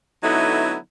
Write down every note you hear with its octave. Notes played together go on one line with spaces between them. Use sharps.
D3 F#3 A3 B3 D#4 E4